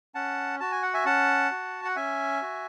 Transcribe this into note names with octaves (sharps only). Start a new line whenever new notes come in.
C#4 F#5 A5
F#4 A5
G#5
F#5
E5 G#5
C#4 F#5 A5
F#4
F#5
C#4 E5 G#5
F#4